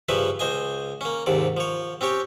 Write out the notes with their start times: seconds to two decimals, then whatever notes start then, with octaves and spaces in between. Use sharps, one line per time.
0.09 G2 C#3 F3 B4 E5
0.39 C#2 C5 D#5 G#5
1.01 A#3 C#4
1.26 D#2 G#2 C3 D5
1.57 F3 C#5
2.01 C4 C#4 G4 C#5